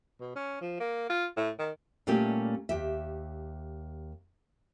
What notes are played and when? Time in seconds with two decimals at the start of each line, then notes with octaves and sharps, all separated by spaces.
0.20 B2
0.36 C#4
0.61 F3
0.80 A#3
1.10 F4
1.37 A2
1.59 D#3
2.07 A#2 G3 A3 A#3 C#4 G4
2.69 D#2 G4 E5